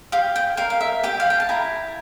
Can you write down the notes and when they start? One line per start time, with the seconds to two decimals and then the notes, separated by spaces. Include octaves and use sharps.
0.12 G4 F5
0.36 G5
0.57 A#4 F5
0.70 F5
0.81 E5
1.03 G4 G5
1.20 F5
1.30 G5
1.40 A5
1.49 E4 A#5